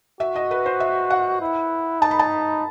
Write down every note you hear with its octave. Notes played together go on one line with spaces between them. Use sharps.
F#4 E5
D#5
B4
C5
E5
F#5
E4
D#4 A5
B5
A5